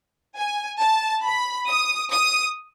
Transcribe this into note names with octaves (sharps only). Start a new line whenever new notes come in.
G#5
A5
B5
D#6
D#6